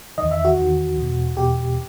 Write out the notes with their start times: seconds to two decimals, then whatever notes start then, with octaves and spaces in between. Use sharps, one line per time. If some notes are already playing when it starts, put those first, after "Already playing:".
0.18 E2 D#3 D#5
0.31 E5
0.45 F#4
0.58 E2 D#3
0.97 E2 B2
1.37 E2 B2 G4